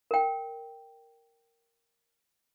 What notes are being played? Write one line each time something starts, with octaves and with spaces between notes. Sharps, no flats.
A#4 G5